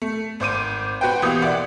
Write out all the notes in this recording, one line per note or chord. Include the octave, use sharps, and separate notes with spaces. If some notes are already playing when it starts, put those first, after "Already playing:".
A3
G#1 C5 D6 D#7
F#4 B4 C5 G5
B2 E3 A#3 G4 D#6 G6
D5 E5 F#5 D6